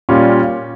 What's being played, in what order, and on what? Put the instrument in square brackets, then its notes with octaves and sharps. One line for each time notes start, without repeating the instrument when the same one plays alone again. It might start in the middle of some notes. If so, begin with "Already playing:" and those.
[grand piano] A#2 G3 C#4 F4